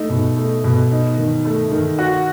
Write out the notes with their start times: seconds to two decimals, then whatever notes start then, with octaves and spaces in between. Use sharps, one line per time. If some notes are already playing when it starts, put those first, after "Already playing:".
Already playing: A3 D#4
0.10 B2
0.37 A3
0.64 B2
0.91 D#4
1.18 D#3
1.45 A3
1.72 D#3
1.99 F#4